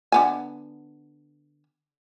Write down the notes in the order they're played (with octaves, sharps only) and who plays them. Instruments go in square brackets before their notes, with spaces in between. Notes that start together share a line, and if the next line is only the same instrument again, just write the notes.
[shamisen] D3 B3 G#5